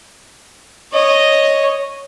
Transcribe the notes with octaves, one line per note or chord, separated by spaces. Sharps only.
C#5 D#5